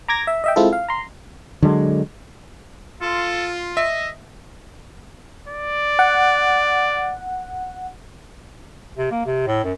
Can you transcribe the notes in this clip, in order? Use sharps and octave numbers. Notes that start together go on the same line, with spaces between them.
A#5 D6 G#6 A#6
E5
D#5 E5 G5
G#3 C4 E4 F4 A4
F5
A#5 C6
D3 F#3 G#3
F4 A4
D#5 E5
D5
F#5
C3
A#3
C3
A2
F#2